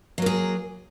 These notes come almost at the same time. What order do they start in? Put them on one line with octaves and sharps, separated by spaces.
F#3 A#3 G#4